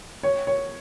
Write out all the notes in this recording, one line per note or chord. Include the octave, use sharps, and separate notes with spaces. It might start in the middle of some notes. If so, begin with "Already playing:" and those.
C#5
C#5